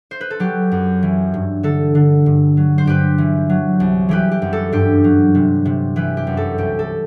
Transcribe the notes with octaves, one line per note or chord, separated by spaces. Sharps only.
C5
B4
A4
F#3 G4
F#2
E3
G2
D3 A4
D3
G2
F#3
C5
G2 G4 B4
E3
F#3
C2
E3 G4 B4
G4
F#2
A4
G2 G4
F#3
C3
C3
E3 G4 B4
G4
F#2
A4
C2 G4
A4